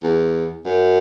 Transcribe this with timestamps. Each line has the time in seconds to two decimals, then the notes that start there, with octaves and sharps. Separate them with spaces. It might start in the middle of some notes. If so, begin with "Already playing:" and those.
0.03 E2
0.66 F#2